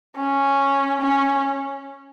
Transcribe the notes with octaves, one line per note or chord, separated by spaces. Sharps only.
C#4
C#4